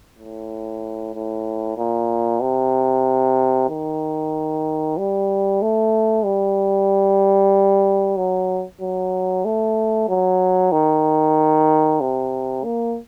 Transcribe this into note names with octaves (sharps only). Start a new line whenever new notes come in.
A2
A2
A#2
C3
D#3
G3
A3
G3
F#3
F#3
A3
F#3
D#3
C3
A#3